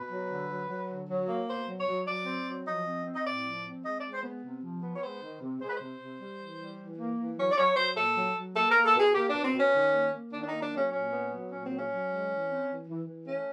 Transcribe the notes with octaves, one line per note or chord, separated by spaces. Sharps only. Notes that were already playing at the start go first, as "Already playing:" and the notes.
Already playing: B2 B4
F#3
D3
F#3
F#3
D3
F#3
A#3
B2 C5
F#3
C#5
F#3
F#3 D5
C4
F#3
F3 D#5
C4
C4
D#5
A2 D5
F3
C4
G#3 D#5
G#3 D5
C5
B3
C3
F3
B3
C#5
G#3 C5
D#3
C3
G#3 C5
B4
C3 C5
C3
G3
E3
G3
E3
A#3
E3
F#3 C#5
D5
F#3 C#5
F#3 C5
A#2 A4
F#3
F#3
A#3 A4
A#3 A#4
A4
B2 G#4
A#3 G4
B2 D4
C4
B2 C#4
D#3
A#3
A#3
D#3 D4
D4
A#3 D#4
D4
F#3 C#4
A#2 C#4
B3
F#3
A#2 C#4
C4
F#3
C#4
F#3
G#3
E3
C4
E3
E3
E3
A3 C#4